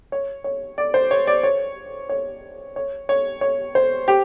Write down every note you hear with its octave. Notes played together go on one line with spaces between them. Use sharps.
C#5
C#5
D5
C5
C#5
D5
C#5
C#5
C#5
C#5
C#5
C5
G4